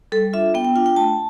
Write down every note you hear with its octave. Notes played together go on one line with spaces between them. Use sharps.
G3 A4
D4 F4 E5
B3 G5
G5
D4 F4 G5
G5
A3 A5